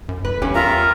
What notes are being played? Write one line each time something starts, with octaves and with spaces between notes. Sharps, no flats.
F#2
F#1 B4
E2 G2 C#4 G4
F4 A#4 E5 A#5